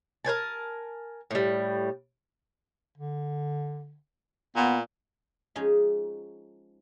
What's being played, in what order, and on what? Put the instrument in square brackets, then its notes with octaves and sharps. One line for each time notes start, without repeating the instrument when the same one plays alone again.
[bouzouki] A#4 C5 G#5 A5
A2 G3
[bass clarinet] D3
[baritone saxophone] A#2 [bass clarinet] B3
[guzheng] F3 G#3 C#4 D#4